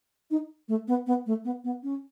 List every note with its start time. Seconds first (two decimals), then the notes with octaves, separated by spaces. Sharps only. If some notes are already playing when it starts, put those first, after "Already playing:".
0.31 D#4
0.68 A3
0.88 B3
1.07 B3
1.26 A3
1.45 B3
1.64 B3
1.83 C#4